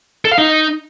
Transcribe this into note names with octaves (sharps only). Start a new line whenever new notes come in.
A4
F5
D#4